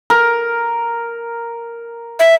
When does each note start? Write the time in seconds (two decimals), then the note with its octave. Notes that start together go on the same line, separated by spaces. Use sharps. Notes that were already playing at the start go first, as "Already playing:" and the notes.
0.10 A#4
2.19 E5